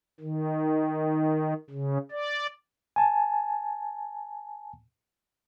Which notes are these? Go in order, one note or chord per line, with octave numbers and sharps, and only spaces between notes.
D#3
C#3
D5
G#5 A5